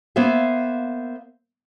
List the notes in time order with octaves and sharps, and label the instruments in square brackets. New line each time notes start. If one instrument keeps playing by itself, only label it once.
[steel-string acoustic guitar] A#3 B3 C5 E5 F5